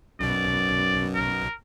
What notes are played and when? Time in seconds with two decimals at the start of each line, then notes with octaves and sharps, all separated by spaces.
0.20 B1 F#2 B2 D5
1.15 A#4